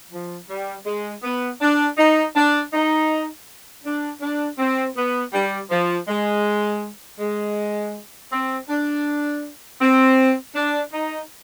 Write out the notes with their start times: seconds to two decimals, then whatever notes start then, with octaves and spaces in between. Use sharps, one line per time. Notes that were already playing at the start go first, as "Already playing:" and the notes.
0.11 F3
0.48 G3
0.86 G#3
1.23 B3
1.60 D4
1.97 D#4
2.35 D4
2.72 D#4
3.84 D4
4.21 D4
4.58 C4
4.96 B3
5.33 G3
5.70 F3
6.08 G#3
7.19 G#3
8.31 C4
8.68 D4
9.80 C4
10.55 D4
10.92 D#4